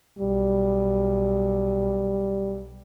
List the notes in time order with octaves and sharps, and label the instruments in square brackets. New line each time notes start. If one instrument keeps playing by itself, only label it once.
[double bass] B1 [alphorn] G3